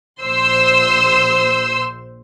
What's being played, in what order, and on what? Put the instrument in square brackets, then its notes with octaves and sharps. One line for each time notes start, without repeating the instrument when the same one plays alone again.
[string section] A#1 C5 C6 E6